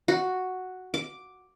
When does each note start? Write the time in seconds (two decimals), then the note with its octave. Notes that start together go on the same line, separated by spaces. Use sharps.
0.08 F#4
0.94 D6